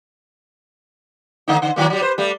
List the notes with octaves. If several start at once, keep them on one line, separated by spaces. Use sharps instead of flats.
D3 A3 D#4
D3
D#3 F#3 A#3
F#3 G3
B4 C5
G3 A3